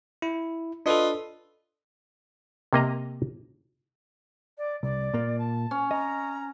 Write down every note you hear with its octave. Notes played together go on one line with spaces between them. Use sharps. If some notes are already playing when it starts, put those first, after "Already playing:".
E4
D4 F4 A4 B4 D#5
C3 A#3 D#5 A#5
D5
C2 D5
A#2 A#3
A5
C#4
D#5 A#5